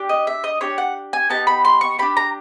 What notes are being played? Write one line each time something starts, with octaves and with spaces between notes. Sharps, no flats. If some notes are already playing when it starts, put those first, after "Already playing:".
Already playing: D4 G4
D#5
E5
D#5
D4 G4 C#5
F#5
G#5
B3 D#4 G4 A5
B5
C6
C#6
D4 G4 B5
A#5